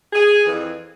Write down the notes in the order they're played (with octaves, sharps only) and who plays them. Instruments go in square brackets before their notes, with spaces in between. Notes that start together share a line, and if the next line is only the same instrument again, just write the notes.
[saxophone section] G#4
F2 E3